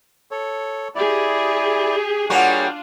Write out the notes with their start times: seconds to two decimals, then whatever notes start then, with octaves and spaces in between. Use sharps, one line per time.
0.31 A4 C#5
0.95 E4 G4 G#4 D5
2.30 G3 A#3 D4 F4 F#4 G#4 C#5